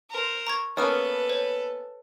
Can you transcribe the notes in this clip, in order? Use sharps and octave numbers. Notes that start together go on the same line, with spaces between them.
A#4 C5
A#5 C#6 G#6
A#3 B3 C#4 A4 B4 C#5 D#6 F6
C5 C#5